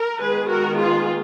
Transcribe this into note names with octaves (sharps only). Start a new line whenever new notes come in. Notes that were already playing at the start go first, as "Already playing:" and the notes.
Already playing: A#4
D#3 G#3 B3 G#4 B4
F#4 A#4
F4 G#4